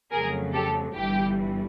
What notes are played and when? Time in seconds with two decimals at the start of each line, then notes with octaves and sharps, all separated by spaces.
0.12 F2 C#3 F#3 A3 G#4 A#4
0.53 G4 A4
0.95 G1 G2 E3 G3 G4